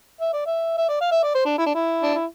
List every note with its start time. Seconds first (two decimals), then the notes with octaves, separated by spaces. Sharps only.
0.21 E5
0.33 D5
0.46 E5
0.78 E5
0.89 D5
1.01 F5
1.12 E5
1.23 D5
1.35 C5
1.46 D4
1.58 E4
1.66 D4
1.74 E4
2.03 D4
2.14 E4